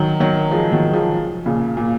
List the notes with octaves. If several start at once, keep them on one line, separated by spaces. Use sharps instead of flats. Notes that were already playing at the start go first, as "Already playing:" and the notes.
Already playing: D#3 F#3
D#3 F#3
F3 G#3
D#3 F#3
F3 G#3
A#2 C#3
A#2